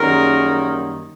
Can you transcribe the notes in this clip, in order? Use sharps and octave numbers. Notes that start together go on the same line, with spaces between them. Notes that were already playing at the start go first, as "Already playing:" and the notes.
Already playing: F#2 D#3 G3 A#3 G#4 A#4